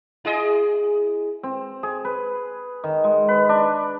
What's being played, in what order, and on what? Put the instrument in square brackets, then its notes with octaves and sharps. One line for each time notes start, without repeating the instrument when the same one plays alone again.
[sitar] E4 G#4 D#5
[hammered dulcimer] C4
G#4
B4
D#3
G#3
B4
D4